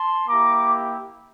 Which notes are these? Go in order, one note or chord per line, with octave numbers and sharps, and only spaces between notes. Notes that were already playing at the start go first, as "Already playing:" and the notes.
Already playing: A5 C6
A#3 E4 G4 A#5 D6